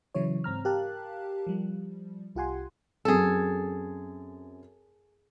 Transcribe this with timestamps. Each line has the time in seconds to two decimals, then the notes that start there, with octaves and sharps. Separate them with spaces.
0.15 C#3 E3 F#3 E4 C#5
0.44 G#2 C4 A#5 F6
0.65 G4 A#4 F5 A5 F#6
1.47 F3 G3
2.36 C2 F4 G4 F#5 G#5 C6
3.05 F#2 C4 G#4 A4